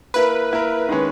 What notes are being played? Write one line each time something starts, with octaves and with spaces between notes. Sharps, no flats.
A#3 E4 A#4 B4
A#3 E4 A#4
D#3 G#3 C#4